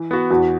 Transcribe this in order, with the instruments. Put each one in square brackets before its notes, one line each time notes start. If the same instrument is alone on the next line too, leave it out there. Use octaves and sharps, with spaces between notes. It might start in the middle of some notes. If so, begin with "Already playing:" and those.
Already playing: [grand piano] E3
B3 F#4
[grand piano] E2 [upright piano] F#4